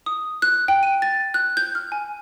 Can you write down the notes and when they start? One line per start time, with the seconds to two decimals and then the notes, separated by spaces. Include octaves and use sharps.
0.06 D#6
0.42 F#6
0.68 G5
0.83 D#7
1.02 A6
1.34 F#6
1.57 G6
1.75 F6
1.92 G#5